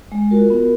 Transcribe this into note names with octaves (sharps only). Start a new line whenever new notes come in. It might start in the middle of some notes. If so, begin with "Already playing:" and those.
G#3
F4 F#4 A#4
B3